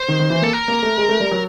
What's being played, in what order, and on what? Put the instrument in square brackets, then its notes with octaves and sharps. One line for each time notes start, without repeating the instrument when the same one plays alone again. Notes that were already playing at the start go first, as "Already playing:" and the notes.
Already playing: [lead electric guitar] C5
[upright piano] D#3
D#3
E3
[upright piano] A#3 [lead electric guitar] A4
[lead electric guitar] A#4
[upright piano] A#3
A3
G#3
A3
G3
F#3